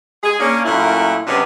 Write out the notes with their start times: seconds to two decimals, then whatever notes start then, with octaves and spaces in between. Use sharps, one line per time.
0.22 G#4
0.39 A#3 C#4 D4
0.65 F#2 A#2 A3 E4
1.27 C3 F#3 G#3 B3 C#4 D4